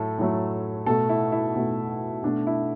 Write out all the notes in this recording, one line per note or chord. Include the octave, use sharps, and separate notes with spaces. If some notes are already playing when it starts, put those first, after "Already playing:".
Already playing: A2 F#3 A3 A4
A2 F#3 A3
B2 A3 A4
E4
E4
B2 A3
B2 A3 D4
E4